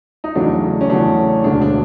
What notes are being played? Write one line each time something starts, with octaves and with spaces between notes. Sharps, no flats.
D#4
E2 C#3 F#3 A3 D4
C#4
E2 C#3 F#3 A3 D4
E1 D2 C#3 D4
D4